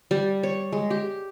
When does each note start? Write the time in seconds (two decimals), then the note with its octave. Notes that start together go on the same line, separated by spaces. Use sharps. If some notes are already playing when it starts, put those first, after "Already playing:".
0.11 G3
0.43 C#5
0.72 G#3
0.90 G4